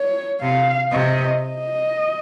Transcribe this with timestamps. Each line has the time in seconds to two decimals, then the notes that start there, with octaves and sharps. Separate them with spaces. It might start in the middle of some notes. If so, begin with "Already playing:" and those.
Already playing: C#5
0.41 C3 F5
0.92 C3 D#5
1.43 D#5